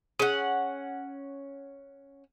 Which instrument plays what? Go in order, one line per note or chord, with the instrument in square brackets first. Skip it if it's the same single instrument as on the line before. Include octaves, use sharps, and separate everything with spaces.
[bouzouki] C#4 F#5 [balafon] G#4